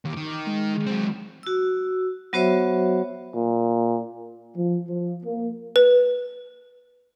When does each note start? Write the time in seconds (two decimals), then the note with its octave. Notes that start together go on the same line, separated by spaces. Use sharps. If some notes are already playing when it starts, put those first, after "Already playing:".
0.05 D#2 D6
0.16 D#3
0.47 G#3
0.87 F#3 C4
1.43 F#4 E6
2.33 F#3 B3 F#4 C5 C#5 E5
3.35 A#2
4.55 F3
4.88 F3
5.23 A#3
5.76 B4